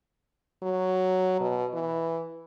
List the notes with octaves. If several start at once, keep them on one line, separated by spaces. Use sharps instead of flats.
F#3
B2
E3